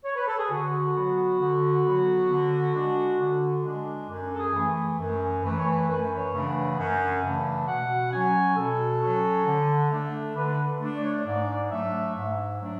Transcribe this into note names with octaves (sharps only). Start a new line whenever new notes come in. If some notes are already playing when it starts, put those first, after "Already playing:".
C#5
B4
A4
G#4
D3 F#4
F#3 B3
D3
F#3 B3
D3
G#3 D4
D3
G#3 D4
F#2
A4
G#4
E3 A3
F#2
E3 A3 B4
C#5
B4
F#2 B4
C#5
C#3 E3 A3 D4
F#5
F#2
C#3 E3 A3 D4
B2 F#5
F#3 C#4 G#5
B2 A4
F#3 C#4
D3
A3 D4
D3 B4
A3 D4
D5
C#5
D5
G#2 D5
F#3 A3 D4 E5
G#2 E5
F#3 A3 D4